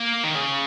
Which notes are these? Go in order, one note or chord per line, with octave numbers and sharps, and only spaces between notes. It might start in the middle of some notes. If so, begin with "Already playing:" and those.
Already playing: A#3
D#3
C#3